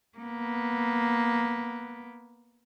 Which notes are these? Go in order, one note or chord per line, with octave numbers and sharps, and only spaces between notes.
A#3 B3